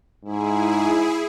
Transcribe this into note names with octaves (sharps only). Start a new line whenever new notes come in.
G#2 E4 G#4